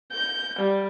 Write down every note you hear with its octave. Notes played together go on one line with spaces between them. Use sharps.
G6
G3